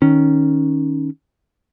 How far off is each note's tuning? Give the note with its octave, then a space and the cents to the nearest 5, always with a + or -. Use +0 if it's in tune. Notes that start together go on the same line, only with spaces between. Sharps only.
D#3 +0 C#4 +0